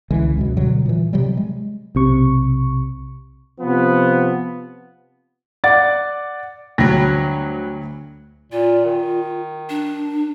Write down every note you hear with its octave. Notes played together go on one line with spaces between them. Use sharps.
C#2 D3 E3 G#3
C#2 F#2 B2
B2 D3 F#3 G3
A#2 E3
C3 F#3 G3
G#3
B1 C3 C#6
C3 F3 B3
D5 F#5 A6
D2 G2 F#3 A#6
A#2 F4
D#3
D4